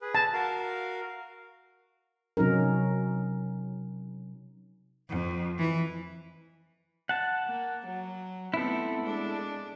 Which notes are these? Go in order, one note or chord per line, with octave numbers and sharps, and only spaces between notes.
G#4 B4
A5
F#4 A#4 F5
C3 F#3 C#4 D#4 A#4
F2
E3
F#5 A5
A#3
F#3
A3 B3 C4 E4 A4
G#3 D4